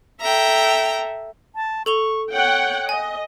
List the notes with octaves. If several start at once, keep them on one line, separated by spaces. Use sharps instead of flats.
A4 E5 G5 A#5
A5
A4 C#6 F7 G7
C#5 F#5 G5
D#5 G#5